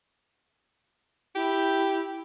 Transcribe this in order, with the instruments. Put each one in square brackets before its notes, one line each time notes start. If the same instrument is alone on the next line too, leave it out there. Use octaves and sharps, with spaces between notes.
[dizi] E4 [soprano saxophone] G4